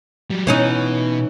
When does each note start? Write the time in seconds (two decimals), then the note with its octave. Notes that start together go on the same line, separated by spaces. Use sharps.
0.30 F#3 G3
0.47 B2 E3 C#4 D#4